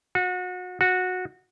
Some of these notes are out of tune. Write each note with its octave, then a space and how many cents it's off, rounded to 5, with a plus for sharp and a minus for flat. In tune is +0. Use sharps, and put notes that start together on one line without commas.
F#4 -30
F#4 -15